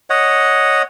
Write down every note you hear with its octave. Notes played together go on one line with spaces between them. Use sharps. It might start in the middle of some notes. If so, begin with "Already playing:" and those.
C#5 D#5 F#5